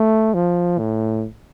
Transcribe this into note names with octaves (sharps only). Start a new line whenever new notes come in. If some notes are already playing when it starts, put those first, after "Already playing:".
Already playing: A3
F3
A2